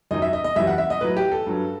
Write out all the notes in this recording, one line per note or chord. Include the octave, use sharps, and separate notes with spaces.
F#2 D#3 F#3 D#5
E5
D#5
D#5
F#2 E3 G3 E5
F#5
E5
D#5
A2 F#3 B4
G4
A4
G2 F#3